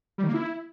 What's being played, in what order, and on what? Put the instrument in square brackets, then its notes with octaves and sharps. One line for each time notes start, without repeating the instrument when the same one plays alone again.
[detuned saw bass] G3
D#3
A#3
E4